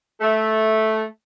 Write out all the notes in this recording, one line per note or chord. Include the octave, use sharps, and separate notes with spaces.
A3